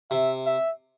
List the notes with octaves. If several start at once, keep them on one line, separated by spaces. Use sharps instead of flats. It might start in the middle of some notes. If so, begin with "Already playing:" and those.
C3 E5
E5